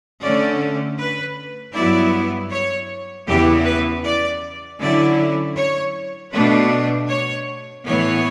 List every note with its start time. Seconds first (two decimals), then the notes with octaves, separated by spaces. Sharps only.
0.22 D3 A3 C#4 D5
0.98 B4
1.74 G2 F#3 B3 E4 D5
2.51 C#5
3.27 E2 C#3 E3 B3 E4 G4
3.65 B4
4.04 D5
4.80 D3 F#3 C#4 E4 D5
5.56 C#5
6.33 B2 A3 D4 B4
7.09 C#5
7.85 A2 E3 B3 C#5